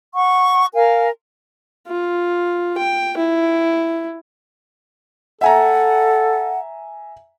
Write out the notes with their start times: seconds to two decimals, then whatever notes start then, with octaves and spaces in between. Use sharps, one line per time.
0.14 F#5 C#6
0.74 A#4 F5 G#5
1.87 F4
2.78 G5
3.17 E4
5.41 A4 E5 F#5 G#5 A#5